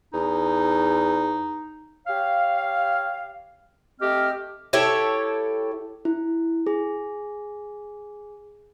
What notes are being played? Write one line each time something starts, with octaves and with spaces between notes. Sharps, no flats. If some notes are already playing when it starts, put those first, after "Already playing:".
E2 D#4
G4 C#5 F5
A3 C4 G4 D#5 F6
E4 G4 A4 C#5
E4
G#4